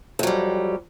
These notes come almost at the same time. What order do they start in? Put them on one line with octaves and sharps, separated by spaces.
F2 F#3 G3